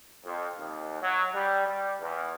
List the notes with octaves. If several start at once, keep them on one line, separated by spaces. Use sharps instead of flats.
F2
D#2
F#3
G3
G3
E2